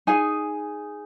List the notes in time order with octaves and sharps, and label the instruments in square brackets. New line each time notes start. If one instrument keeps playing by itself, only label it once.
[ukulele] D#4 G#4 G#5